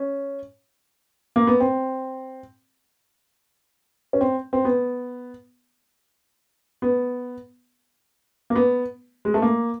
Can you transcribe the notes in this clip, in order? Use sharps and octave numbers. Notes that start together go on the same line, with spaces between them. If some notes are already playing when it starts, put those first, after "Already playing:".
Already playing: C#4
A#3
B3
C4
C#4
C4
C4
B3
B3
A#3
B3
G#3
A3
A#3